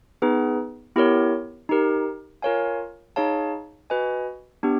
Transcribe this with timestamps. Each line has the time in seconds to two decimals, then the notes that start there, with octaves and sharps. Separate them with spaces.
0.22 B3 D#4 G#4 B4
0.96 B3 E4 G4 A#4 C#5
1.69 D#4 G4 A#4
2.42 F4 A#4 C#5 F5 G#5
3.16 D#4 G#4 C#5 F5 A5
3.90 F#4 B4 D#5 G#5
4.63 B3 D4 G4